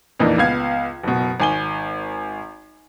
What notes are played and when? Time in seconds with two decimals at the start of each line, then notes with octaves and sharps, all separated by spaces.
0.20 F2 A#2 E3 A#3 D4 D#4
0.38 C#2 B3 F5 G#6
1.04 F#1 B2
1.40 G#1 G#5 G7